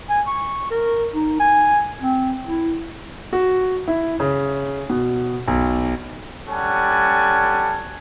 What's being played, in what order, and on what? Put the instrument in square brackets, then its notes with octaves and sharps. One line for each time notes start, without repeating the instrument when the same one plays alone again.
[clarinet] G#5
C#6
A#4
D#4
G#5
C4
E4
[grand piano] F#4
E4
C#3
B2
B1
[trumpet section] G3 C#4 A4 F#5 G#5